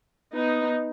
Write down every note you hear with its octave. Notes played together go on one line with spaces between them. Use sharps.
B3 D#4